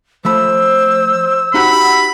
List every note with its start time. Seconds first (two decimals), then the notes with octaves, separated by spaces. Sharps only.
0.25 F3 A3 C5 B5 E6
1.54 D#4 F#4 G4 F#5 B5